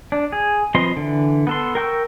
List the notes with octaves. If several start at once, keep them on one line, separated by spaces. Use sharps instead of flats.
D4
G#4
F3 C4 B4 D#5 C6
D3 E3
B3 A4 C6
A#4 G5 C#6 E6